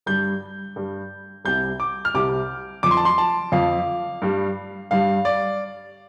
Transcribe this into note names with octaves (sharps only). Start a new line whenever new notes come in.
G2 G3 G6
G2 G3
C2 C3 G3 G6
D6
F6
C2 C3 G3 D6
F2 F3 D6
C6
A5
C6
A5
F2 F3 F5
G2 G3
G2 G3 F5
D5